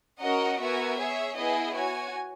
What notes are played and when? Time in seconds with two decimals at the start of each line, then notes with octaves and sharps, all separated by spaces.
0.20 C#4 F#4 A#4 D#5 F#5
0.59 B3 F#4 A#4 E5 G#5
0.97 G#4 C#5 E5
1.36 B3 E4 G#4 D#5 G#5
1.74 F#4 C#5 G#5